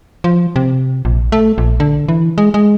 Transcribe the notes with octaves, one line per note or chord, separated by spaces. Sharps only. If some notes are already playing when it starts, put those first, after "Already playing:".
F3
C3
A#1
A3
A#1
D3
E3
G#3
G#3